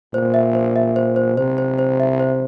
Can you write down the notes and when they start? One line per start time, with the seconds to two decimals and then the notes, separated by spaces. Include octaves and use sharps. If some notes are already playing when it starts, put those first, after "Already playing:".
0.13 A#2 C5
0.34 E5
0.55 C5
0.76 E5
0.96 C5
1.16 C5
1.37 C3 C5
1.58 C5
1.79 C5
2.00 E5
2.20 C5